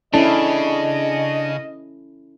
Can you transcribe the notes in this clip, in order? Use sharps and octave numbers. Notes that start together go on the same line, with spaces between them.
C#3 C#4 D4 E4 A4 D#5